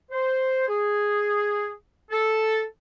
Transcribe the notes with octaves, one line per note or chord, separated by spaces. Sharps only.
C5
G#4
A4